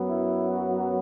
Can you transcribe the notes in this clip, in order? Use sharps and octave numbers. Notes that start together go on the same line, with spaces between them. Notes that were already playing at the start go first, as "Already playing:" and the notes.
Already playing: F#2 F#3 B3
E4
F#4